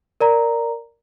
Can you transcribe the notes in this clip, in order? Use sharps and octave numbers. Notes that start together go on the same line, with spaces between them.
A#4 D5 A#5